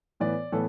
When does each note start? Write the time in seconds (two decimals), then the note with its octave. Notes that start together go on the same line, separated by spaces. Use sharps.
0.20 A2 E3 B3 D5
0.52 A2 E3 B3 A4